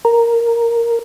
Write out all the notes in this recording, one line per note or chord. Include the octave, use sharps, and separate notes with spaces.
A#4